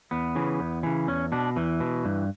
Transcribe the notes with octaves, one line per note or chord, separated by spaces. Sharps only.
E2 B3
C#3 E3
E2
C#3 E3
E2 C#4
B2 D4
E2 E3
B2
G2